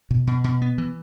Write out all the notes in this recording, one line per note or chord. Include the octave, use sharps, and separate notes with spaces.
B2
B2
B2
B3
E3